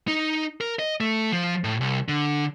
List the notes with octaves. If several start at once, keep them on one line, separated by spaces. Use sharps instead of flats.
D#4
A#4
D#5
A3
F3
A2
C2
D3